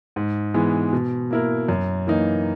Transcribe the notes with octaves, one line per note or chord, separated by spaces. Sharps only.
G#2
E3 G#3 B3
B2
A#3 E4 A#4
F#2
E3 A#3 D#4